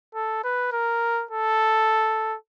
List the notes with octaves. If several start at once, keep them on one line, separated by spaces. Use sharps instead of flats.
A4
B4
A#4
A4